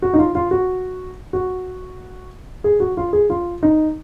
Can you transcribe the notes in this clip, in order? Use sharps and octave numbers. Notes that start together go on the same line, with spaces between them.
F#4
D#4
F4
F4
F#4
F#4
G#4
F#4
F4
G#4
F4
D#4